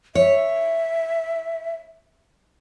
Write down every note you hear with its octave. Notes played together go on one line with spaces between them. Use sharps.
C#5 E5